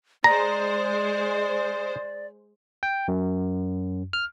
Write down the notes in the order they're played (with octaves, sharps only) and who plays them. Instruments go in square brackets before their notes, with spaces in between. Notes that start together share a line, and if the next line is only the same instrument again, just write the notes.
[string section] G#3 C5 [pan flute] D5 [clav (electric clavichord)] A#5
[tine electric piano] G5
F#2
F6